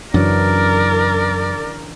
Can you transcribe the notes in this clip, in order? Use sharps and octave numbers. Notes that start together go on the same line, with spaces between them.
F#2 C#3 E3 F#3 D4 A#4 D5